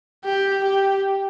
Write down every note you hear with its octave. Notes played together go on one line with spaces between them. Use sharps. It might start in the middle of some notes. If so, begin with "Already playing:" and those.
G4
G4